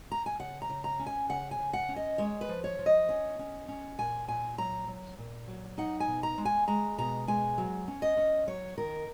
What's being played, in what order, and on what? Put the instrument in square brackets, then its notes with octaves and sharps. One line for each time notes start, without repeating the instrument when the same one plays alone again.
[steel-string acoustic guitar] A#5
G#5
C#3 F#5
A#5
C#3
A#5
C#4
G#5
C#3 F#5
G#5
C#3
F#5
C#4
D#5
G#3 C#5
B4
F3
C#5
F3
D#5
C#4
C#4
C#4
A#2 G#5
A#2 G#5
F#3 A#5
F#3
A#2
F#3
D#4 F#5
G#5
B2
A#5
G#3
G#5
G#3 A#5
B2 A#5
G#3 G#5
F#3
C#4
D#5
C#4
F#3 C#5
D#3 A#4